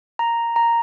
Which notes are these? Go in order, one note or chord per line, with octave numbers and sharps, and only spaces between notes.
A#5
A#5